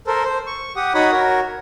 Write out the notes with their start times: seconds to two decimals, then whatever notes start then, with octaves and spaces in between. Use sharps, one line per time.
0.07 A4 A#4 C5
0.24 C5
0.47 C#6
0.76 G4 F#5 D#6
0.94 D#4 F#4 C#5 F#5 B5 D#6
1.11 F#4 A#4 C#5